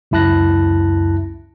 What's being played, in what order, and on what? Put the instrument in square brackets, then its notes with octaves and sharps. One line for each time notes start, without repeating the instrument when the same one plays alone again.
[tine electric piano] C#2 F#2 E4 A5 F#6 A#6